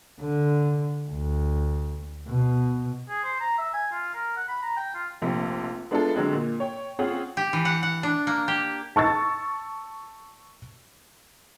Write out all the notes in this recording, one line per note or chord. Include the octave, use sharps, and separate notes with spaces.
D3
D2
B2
G#4
C5
A#5
E5
G#5
F4
A#4
F#5
B5
A#5
G5
F4
F1 A#1 C3 G4
G#3 B3 D4 E4 F4 A4
D3 F#3 G#3 C4
A#2
C#5 G5
C4 C#4 F4 G#4 F#5
G4
E3
F#5
F#5
D4
A#3
G4
A5 C#6 E6 A6